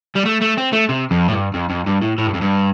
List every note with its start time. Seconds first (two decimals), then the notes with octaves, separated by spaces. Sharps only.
0.16 G3
0.26 A3
0.42 A3
0.58 C4
0.73 A3
0.89 C3
1.11 F2
1.28 A2
1.33 G2
1.54 F2
1.70 F2
1.86 G2
2.01 A2
2.18 A2
2.26 G2
2.34 F2
2.41 G2